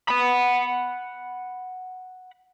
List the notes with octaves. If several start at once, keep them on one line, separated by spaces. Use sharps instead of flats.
F#5 B5